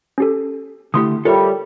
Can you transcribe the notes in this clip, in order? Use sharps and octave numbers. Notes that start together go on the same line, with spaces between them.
C#4 G4 A4
D3 A3 E4 G4 C6 D#6
G3 F4 A4 A#4 C#5 E5